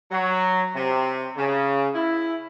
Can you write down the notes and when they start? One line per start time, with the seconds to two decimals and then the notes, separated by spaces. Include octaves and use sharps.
0.11 F#3
0.75 C3
1.36 C#3
1.94 E4